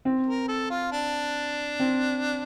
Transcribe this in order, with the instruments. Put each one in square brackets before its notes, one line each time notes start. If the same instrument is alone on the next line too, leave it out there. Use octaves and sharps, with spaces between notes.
[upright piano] C4
[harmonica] A#4
A4
F4
D4
[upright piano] C4